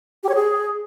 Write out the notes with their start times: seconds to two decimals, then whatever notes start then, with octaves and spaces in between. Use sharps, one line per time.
0.23 G4
0.29 C#5
0.35 G#4